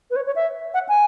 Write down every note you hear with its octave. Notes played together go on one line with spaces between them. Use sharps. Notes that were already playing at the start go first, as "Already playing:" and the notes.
B4
C#5
C#5
E5
F#5
G#5